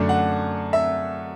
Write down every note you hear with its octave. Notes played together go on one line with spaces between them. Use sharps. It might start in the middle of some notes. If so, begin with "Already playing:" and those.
Already playing: F#2 D3 A3 D4
F#5
E5